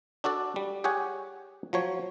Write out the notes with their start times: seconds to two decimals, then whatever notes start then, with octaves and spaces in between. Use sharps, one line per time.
0.24 D4 F#4 A4 D5
0.56 G3
0.84 G4 G#4 C#5 F#5 G#5
1.73 F3 F#3 C#5